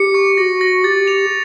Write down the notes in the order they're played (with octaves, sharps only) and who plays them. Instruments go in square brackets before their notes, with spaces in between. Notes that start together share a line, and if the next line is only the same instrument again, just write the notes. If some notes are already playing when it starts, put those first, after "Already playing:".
Already playing: [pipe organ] G4 [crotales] C#7
[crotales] C#6
[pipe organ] F#4 [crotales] A#6
[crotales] A#6
[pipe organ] G4 [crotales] A6
[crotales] F7